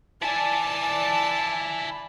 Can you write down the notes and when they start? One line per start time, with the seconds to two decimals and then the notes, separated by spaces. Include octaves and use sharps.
0.22 E4 D5 G#5 A5